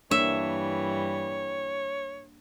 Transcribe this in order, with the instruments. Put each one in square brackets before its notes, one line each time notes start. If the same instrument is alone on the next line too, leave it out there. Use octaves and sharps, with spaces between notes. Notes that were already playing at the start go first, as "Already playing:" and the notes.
[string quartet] G2 E3 G3 [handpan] A#3 D4 [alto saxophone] C#5 [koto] E5